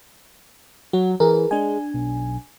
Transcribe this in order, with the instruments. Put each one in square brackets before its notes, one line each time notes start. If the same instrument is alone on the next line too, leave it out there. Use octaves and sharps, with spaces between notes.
[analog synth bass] F#3 [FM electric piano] F#4
[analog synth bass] E3 [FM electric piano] G#4 A#4
[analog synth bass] G#3 [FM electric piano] D4 G#5
[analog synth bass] B1